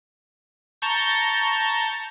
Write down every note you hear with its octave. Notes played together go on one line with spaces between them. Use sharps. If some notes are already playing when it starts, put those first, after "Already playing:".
A5 A#5 C#6 G6